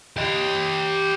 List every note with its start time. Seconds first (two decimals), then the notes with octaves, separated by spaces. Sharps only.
0.17 G4 D#5